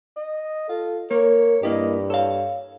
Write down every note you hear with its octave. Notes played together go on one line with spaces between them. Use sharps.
D#5
F4 A4
A#3 A#4 C#5
G2 A#3 E4 G4 D#5
A4 C#5 F5